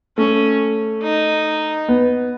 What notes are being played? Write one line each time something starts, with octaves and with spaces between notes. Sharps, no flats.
A3 C#4
D#4
B3